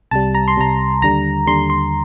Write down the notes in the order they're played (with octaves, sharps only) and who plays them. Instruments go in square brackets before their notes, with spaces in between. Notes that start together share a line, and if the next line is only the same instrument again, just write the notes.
[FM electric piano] C2 C3 G3 A5
A#5
C6
C2 C3 G3 A#5
D#2 D3 G3 A#5
D#2 D3 G3 C6
C6